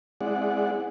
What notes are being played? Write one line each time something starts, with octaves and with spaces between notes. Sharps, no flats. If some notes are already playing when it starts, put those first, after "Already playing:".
G#3 C4 E4 G#4 D5 F#5